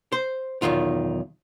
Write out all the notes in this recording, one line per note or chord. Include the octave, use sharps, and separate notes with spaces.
C5
B1 E2 D#3 F4